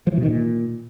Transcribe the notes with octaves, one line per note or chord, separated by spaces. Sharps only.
F3
E3
B2
D#3
A#2